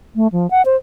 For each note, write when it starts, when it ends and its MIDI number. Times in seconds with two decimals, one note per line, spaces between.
0.16 0.27 57
0.32 0.50 53
0.51 0.62 78
0.65 0.76 72